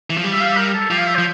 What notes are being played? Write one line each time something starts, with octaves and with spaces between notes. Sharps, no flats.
E3
F3
G3
E5
F5
E5
A#4
A4
F3 G4
F5
E5
C5
F3